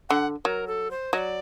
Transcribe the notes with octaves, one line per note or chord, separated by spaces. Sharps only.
D3 F#5
F#3 A#4
A4
C5
F#3 D5 D#5